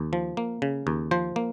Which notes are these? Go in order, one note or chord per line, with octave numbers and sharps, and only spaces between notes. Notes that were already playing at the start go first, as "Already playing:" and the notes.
Already playing: D#2
F3
A#3
C#3
D#2
F3 C5
A#3